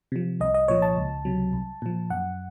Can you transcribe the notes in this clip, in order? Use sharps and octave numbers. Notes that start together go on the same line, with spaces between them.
C3 F3
C2 D#5
D#5
A#2 F3 C#5
A5
C#2
C3 F#3
C2
A#2 F3
F#2 F#5